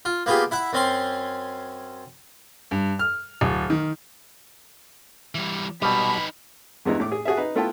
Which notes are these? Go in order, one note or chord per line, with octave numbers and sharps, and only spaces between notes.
F4
A#3 B3 F4 G4 G#4
E4 E5 F#5
F#2 C4 C#4 C6
G2
F6
D1
D#3
E3 G3
B2 G3 D#4 B4 B5
E2 G2 G#3 B3 D#4 E4
A2 D6
G#4
F#4 G#4 A4 E5
D#4 B4
A3 B3 E4 F4 G5 A5